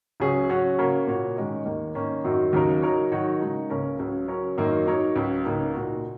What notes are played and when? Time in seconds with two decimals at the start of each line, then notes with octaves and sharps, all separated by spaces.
0.20 C#2 C#3 F#3 C#4 G#4
0.49 F#3 C#4 F#4 C#5
0.79 C#3 A#3 F#4 A#4 C#5
1.07 A#2 A#3 F#4 C#5
1.36 D#3 G#3 C#4 A#4 D#5
1.65 D#2 D#3 A#3
1.95 D#3 A#3 C#4
2.24 F#2 D#3 F#3
2.53 D#2 C#3 F#3 D#4 A#4
2.82 F#3 D#4 A#4 C#5
3.12 D#3 F#3 D#4 F#4 C#5
3.41 C#3 G#3 D#4 A#4
3.70 C#2 C#3 A#3 C#4 A#4
3.99 C#2 C#3 F#3
4.28 F#3 C#4 A#4 C#5
4.57 F#2 D#3 F#3 A#3 D#4
4.87 F#3 D#4 A#4 C#5
5.16 C#2 C#3 F#3
5.45 C#2 C#3 A#3 D#4
5.74 A#2 A#3 D#4 F#4